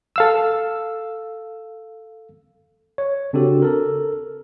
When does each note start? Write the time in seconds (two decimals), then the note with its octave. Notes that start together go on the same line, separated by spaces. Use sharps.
0.16 A4 F5 E6
2.98 C#5
3.33 C#3 C4 D4 F#4 G4 A4
3.62 A4 A#4